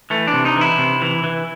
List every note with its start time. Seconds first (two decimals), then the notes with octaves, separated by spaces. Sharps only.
0.10 E3 A3
0.27 D4
0.33 C3
0.45 D#4
0.56 E3
0.61 E4
0.78 C3
1.02 E3
1.24 E3